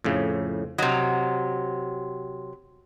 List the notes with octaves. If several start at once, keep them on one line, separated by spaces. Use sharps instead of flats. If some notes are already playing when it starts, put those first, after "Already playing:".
F2 A2 C#3
C3 F#3 D#5